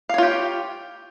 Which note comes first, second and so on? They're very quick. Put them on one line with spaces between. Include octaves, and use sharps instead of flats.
F5 C#5 F4 G4